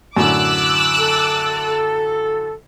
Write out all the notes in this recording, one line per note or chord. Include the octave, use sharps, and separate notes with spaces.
F#2 A2 D3 D6 E6 F#6
A4